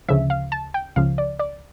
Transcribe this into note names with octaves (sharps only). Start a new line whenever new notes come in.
D2 C#3 F3 E5
F5
A5
G5
C#2 C#3 F3 F5
D5
D5